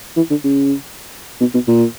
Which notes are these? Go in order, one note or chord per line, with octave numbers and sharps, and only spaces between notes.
E3
D3
C#3
B2
B2
A#2